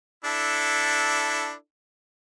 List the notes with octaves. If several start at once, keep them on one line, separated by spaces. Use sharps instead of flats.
D4 E4 A4